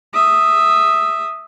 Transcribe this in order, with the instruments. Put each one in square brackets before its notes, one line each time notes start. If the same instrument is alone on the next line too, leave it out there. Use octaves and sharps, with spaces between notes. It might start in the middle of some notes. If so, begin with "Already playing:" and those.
[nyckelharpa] E5 D#6